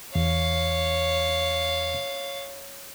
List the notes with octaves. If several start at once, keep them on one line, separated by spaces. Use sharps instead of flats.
E2 C#5 F5